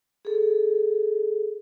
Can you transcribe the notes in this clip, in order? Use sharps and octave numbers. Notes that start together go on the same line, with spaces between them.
G#4 A4